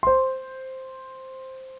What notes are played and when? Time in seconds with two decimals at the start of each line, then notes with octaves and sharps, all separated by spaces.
0.03 C5 C6